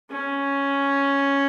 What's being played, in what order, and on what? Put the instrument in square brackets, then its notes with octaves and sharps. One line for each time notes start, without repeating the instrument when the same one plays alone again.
[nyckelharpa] C#4